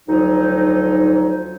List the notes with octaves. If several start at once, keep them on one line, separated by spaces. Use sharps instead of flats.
D2 F3 F#3 D#4